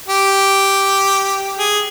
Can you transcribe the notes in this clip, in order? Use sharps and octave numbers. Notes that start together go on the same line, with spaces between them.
G4
G#4